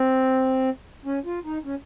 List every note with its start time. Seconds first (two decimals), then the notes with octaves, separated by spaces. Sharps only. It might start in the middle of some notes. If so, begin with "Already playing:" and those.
Already playing: C4
1.05 C#4
1.25 F4
1.44 D#4
1.65 C#4